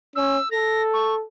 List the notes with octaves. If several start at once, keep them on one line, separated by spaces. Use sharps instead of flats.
C#4 E6
A4 A#6
C#6